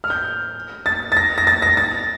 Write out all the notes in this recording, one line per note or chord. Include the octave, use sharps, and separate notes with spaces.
F6
G6
A6
A6
A#6
A#6
A6
A#6
A6